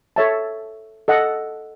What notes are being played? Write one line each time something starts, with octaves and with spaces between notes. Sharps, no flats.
A4 C#5 E5 A5
A4 D#5 F#5